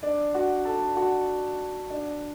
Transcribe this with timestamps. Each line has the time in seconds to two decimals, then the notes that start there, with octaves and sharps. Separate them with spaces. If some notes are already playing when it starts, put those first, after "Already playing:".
0.03 D4 D5
0.34 F#4 F#5
0.65 A4 A5
0.96 F#4 F#5
1.90 D4 D5